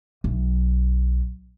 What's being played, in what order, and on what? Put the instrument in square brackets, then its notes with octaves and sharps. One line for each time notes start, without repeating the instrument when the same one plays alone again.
[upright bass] B1